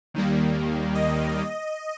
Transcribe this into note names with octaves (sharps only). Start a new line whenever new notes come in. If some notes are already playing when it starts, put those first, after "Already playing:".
D#2 D#3 G3 A#3
D#5